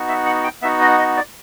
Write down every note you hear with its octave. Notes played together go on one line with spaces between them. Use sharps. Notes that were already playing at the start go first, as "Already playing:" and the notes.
Already playing: B3 D#4 F#4
E5
F#5
G5
B3 D#4 F#4 E5
D#5
D#5
D5